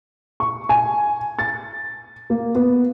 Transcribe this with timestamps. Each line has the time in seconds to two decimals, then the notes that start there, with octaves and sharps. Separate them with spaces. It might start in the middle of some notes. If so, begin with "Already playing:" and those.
0.40 C#6
0.69 G#5
1.39 A6
2.30 A#3
2.55 B3